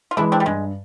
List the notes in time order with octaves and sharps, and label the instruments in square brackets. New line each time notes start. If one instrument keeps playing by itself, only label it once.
[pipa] F4
[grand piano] E3 G#3 [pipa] D4 E4
[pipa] C4 D4
G3
[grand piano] G2 [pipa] G#3